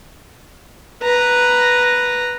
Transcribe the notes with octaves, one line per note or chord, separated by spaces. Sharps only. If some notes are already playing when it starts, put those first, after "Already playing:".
B4 A#5